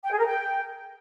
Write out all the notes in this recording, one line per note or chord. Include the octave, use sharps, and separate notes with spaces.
G5
G#4
A#4
G5